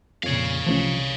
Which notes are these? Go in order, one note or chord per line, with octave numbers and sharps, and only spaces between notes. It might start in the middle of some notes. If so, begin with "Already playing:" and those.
F2 A#2 C#3 C#5 F5
C2 E3 F3 A3 C#4